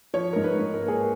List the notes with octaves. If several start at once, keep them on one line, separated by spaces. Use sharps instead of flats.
F3 C#5
G#2 A#4
B4
G#2
A#4
A#3
G#4